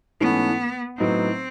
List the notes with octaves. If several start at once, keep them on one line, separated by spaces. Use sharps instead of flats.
G#2 E3 A3 B3 C#4
A2 F#3 B3 C4 D#4